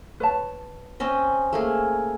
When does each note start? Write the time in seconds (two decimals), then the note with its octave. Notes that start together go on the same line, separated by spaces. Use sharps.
0.20 B4 C#5 A5
1.00 C4 C#4 D#5
1.53 A3 A#3 G#4